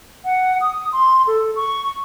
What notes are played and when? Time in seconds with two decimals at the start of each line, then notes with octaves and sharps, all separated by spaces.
0.25 F#5
0.61 D#6
0.92 C6
1.27 A4
1.56 C#6